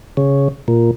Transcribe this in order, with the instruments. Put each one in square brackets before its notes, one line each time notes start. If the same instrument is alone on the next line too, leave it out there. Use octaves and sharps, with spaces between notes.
[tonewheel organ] C#3
A#2